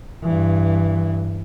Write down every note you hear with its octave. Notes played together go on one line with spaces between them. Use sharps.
G2 E3